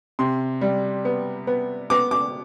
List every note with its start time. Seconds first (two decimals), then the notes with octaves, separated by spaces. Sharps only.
0.19 C3 C6
0.61 G3
1.05 B3
1.47 B3
1.90 B3 D6
2.11 D6